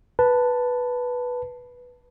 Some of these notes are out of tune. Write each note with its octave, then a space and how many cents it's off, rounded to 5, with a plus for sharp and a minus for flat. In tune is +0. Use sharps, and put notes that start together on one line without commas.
B4 -5 A5 +5